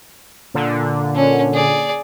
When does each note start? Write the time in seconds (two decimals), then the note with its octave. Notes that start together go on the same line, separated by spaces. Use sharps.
0.54 A#2 D3
1.16 C#4
1.54 G#4 D5